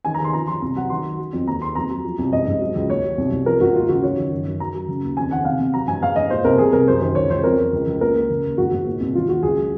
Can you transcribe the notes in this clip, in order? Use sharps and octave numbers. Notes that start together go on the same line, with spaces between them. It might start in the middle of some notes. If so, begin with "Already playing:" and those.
D#3 G#5
A#5
D#3 C6
F3 A#5
F3 C6
C2 A#5
F#3 F#5
D#3 C6
F#3
F#3
F2
D#2 A#5
D#2 C6
F2 A#5
F#3
F3
C2
G#2 D#5
G#2
F#3
C#2
D#2 C#5
F#3
C2
C2
F3 A#4
G#2 F#4
D#2 F4
C#3 F#4
F#3 C#5
D#3
F#2
F#2
F#2 A#5
F#3
C#3
D#2
F2 G#5
D#3 F#5
C3 F5
C3
F#3 A#5
G#2 G#5
G#2 F5
G#2 D#5
A#2 C5
C2 A#4
C3 G#4
C2 A#4
F#2 C5
D#3 C5
C#2 C#5
C#2 C5
F2 A#4
F2
C#2
C#2
A#2 A#4
A#2
C#3
D#2
G#2 F#4
G#2
A#2
C2
D#3 F4
D#2 F#4
C#2 G#4
F#3